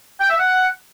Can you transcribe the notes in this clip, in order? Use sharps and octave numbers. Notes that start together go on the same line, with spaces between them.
G5
E5
F#5